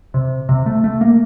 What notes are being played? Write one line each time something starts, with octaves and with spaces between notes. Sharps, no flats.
C3
C3
A3
A3
A#3